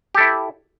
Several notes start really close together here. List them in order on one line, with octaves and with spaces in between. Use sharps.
G4 A4 E4